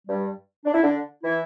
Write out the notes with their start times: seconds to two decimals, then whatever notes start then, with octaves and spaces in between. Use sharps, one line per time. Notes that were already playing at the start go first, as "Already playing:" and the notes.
0.07 G2 G3
0.65 D4
0.74 E4
0.82 D3 D4
1.23 E3 E4